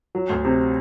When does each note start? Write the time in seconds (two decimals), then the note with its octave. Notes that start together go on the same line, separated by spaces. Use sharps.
0.15 F#3
0.30 D2
0.45 C3